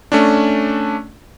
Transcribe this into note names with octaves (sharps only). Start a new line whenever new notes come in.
A3 C#4 D4